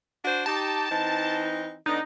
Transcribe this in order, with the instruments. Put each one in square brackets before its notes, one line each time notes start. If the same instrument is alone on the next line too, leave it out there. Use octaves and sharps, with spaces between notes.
[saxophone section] D4 F#4 C5
[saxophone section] D#4 G4 [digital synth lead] A5
[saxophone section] E3 C4 D#4
[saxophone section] D3 B3 D4 [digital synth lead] D#4